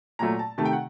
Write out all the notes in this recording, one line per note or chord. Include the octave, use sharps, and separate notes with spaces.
A#2 F#3 A3 A#5
A5
C3 D#3 A3 A5
G5
F#5